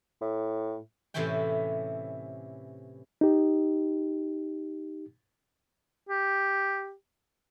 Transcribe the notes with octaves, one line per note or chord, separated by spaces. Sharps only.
A2
A2 C3 E3 C#4 E4 G5
D#4 G4
G4